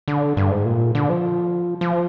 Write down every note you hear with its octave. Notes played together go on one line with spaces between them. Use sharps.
D3
G2
G#2
A#2
D3
F3
F3